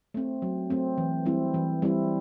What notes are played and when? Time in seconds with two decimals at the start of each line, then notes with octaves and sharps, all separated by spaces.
0.14 A3 C4
0.42 F#3
0.70 A3 C4
0.98 E3
1.25 G3 C4 E4
1.54 E3
1.82 G3 C4 E4